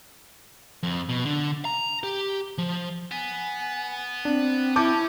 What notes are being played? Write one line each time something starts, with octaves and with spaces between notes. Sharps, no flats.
F2
B2
D3
A#5
G4
F3
B3 G#5
C4 D4
C#4 E4 A5 D6 G6